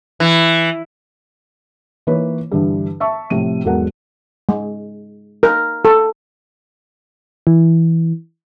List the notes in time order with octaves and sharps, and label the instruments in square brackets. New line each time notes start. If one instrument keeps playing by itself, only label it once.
[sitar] E3
[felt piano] E3 A#3 D#4 B4 C#5
G2 D3 E3
E5 A5 C#6
A2 C3 F3 D#7
E1 G#2 F#3 A4 A#4 F#5
[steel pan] G#3
A#4
A4
[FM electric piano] E3